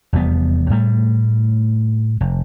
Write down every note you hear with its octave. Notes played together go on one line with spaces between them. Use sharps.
F1 E2 G3 B3
A2 G3 A3
F1